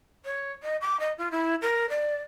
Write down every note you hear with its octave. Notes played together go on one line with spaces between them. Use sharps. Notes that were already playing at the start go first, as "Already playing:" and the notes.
C#5
D#5
D6
D#5
F4
E4
A#4
D5